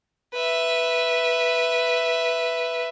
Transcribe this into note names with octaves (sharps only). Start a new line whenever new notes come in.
B4 E5